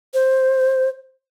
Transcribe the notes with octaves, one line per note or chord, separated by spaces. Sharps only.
C5